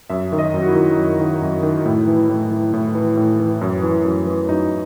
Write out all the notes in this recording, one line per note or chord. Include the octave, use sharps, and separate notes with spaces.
F#2 E5
D#3
D#5
F#2
F#4
E4
D#3
F#2
D#3
F#2
D#3
A2 E4
E3
A2
E3
A2
E3
A2
E3
F#2
E3
F#2
E3
F#2 D#4